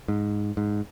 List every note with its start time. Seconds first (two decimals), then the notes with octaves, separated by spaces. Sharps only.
0.08 G#2
0.57 G#2